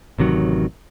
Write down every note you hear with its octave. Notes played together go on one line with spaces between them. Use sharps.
A1 C3 D#3 F#3